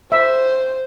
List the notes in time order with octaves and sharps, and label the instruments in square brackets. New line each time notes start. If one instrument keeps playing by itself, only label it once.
[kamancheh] C5 [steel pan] E5